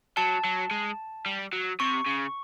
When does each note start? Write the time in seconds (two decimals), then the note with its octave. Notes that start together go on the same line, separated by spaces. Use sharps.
0.17 F#3 A5
0.45 F#3
0.71 G#3
1.26 G3
1.53 F#3
1.80 C3 C#6
2.06 C#3